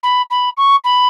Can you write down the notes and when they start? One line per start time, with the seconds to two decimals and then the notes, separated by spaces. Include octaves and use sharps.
0.03 B5
0.30 B5
0.57 C#6
0.84 B5